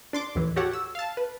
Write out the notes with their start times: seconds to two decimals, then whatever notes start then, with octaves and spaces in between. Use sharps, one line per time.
0.13 D4 C6 D6
0.35 D#2 A2 E3
0.56 F#4 G4 A4 C#5 F#5
0.73 E6
0.95 F5 A5
1.17 B4